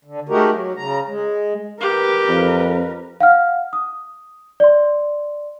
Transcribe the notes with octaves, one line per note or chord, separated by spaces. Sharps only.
D3
G#3 A3 D#4 F#4 G4 A#4
F#3
C#3 A#5
G#3
G4 A#4 B4
F2
F5 F#5 F6
D#6
D5 C6